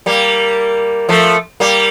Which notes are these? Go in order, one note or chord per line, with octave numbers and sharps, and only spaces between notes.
G3 A#3
F3 A3
G3 A#3